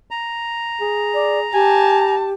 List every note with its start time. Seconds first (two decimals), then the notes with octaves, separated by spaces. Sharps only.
0.11 A#5
0.81 G#4
1.14 D5
1.54 G4 G#5 A5